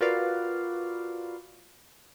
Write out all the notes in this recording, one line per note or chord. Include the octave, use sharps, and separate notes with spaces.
F4 F#4 A#4 B4 D5 F5